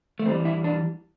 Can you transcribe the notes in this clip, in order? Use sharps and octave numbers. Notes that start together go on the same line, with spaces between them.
A3
E2 E3 G3 C4
E4
D4